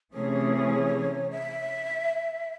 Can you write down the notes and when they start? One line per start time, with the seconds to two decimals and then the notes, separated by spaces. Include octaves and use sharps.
0.14 C3 E3 A3 C#4 G#4 C#5
1.31 E5